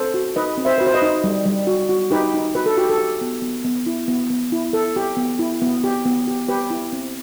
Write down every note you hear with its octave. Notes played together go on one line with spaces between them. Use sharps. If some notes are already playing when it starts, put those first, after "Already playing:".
Already playing: C4 A4 C5
F#4
D#4 B4 D#5
C4
C5 E5
F#4 B4
C5
B4 D#5
D#4
G3
G3
F#4
F#4
D#4 G4 B4
D#4
F#4 B4
A4
F#4 G4
A4
G4
B3
B3
B3
E4
B3
B3
E4
E4 A4
G4
B3
E4
B3
G4
B3
G4
G4 B4
E4
C4